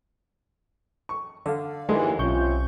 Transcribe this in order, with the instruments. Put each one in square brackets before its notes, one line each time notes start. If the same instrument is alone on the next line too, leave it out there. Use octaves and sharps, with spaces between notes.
[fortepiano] C#6
[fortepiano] D3 [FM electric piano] D5 F5
[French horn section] D#2 E3 [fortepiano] D3 G#3
[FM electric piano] B1 C#6 G6 [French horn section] C3 C#4 F4